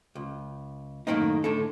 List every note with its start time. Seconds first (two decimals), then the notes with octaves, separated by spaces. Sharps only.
0.15 C#2
1.07 F#2 A2 D#3 A#3 D#4
1.44 A2 D3 A4